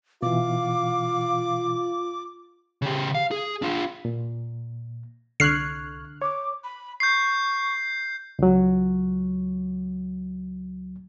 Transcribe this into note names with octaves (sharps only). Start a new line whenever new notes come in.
B2 E3 F4 F5 D6
C#3 G4
F5
G#4
D4 F4
A#2
C2 D3 C#6 F6 F#6 G#6 C7
C#5 D6
B5
C#6 G6 C7
C#2 F#3